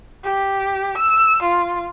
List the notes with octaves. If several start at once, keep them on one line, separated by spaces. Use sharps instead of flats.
G4
E6
F4